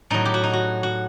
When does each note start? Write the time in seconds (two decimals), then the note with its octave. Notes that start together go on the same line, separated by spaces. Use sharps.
0.10 A2 F#3 D#4
0.25 G4
0.34 F#4
0.44 D#4
0.53 F#4
0.83 F#4